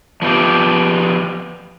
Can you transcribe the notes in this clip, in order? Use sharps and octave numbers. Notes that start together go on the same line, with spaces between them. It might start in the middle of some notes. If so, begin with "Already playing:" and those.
F3 B3 G4